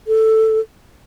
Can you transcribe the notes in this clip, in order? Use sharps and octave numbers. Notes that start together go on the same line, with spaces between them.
A4